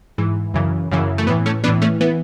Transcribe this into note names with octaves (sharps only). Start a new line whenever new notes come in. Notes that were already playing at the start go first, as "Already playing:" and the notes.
G#2 E3
F#2 C#3 E3
F#2 C#3 E3
A3
A2 E3 B3
A3 C#4
A2 E3 B3 D4
A3 C#4
E3 B3